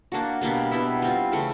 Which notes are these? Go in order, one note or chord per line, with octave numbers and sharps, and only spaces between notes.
A#3 D4 F#4
B2 G3 A#3 D4
B2 G3 B3 E4
G3 C4 F4
C#3 E3 A3 C#4